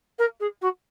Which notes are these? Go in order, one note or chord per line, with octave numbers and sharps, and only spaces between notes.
A#4
G#4
F#4